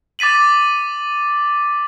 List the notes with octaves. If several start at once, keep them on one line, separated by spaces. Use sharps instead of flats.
D6 A6 B6 D#7 F#7